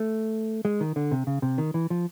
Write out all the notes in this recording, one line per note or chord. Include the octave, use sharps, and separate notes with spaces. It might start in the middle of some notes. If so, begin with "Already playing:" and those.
Already playing: A3
G#3
D#3
D3
C3
C#3
C3
D#3
E3
F3